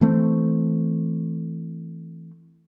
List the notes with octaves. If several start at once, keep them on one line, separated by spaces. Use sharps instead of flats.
E3 A3 C4